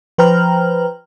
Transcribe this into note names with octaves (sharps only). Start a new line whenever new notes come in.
F3 B4 C5 G5 A#5 F6